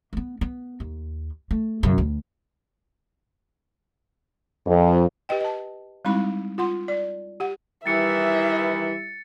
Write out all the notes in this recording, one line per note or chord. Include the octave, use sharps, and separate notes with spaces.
A#3 B3
B3
D#2
A3
F#2 C#3
D2
F2
G4 B4 D#5 G5
D#5 A5
G3 G#3 C4 D#4 E4 B5
F4 F#5 C6
D5
G4 F#5
D#3 E3 G3 E4 G4 E5 A6 C#7